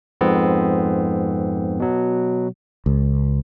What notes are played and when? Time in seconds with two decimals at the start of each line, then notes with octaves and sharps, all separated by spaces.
0.21 F2 G#2 B3 C4
1.80 B2 F#3
2.86 C#2